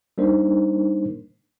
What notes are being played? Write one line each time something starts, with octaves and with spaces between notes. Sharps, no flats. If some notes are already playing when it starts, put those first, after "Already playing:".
G3 A#3 D4 D#4 A#4 C5